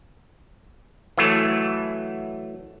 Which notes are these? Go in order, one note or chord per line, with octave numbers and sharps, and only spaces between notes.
E3 F#3 A3